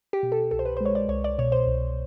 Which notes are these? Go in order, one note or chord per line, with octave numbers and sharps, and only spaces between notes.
G4
B2
A4
C2 A4
C5
B4
G#3 C5
C#5
D5
C2 C#5
D5
B2 C#5
C5
C2